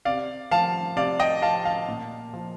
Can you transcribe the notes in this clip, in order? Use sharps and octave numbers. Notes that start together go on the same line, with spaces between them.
C3 D5 F5
F3 F5 A5
C3 D5 F5
D#5 G5
F3 F5 A5
F5 A5
A#2
F3